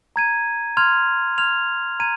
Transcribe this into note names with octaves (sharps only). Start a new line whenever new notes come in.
A#5 G#6 D#7
C6 F6 G#6 F7
C6 F6 G#6 F7
A#5 G#6 D#7